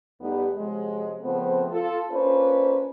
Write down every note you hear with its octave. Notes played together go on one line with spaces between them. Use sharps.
E2 G3 A3 B3 D#4 G4
C3 F3 F#3 G#3
C#3 F3 A3 B3 C4
F4 A4
A#3 C#4 D4 F4 B4 C5